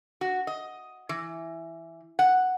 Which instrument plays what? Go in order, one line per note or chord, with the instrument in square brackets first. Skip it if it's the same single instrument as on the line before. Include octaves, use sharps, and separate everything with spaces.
[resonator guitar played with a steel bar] F#4
D#5
E3
F#5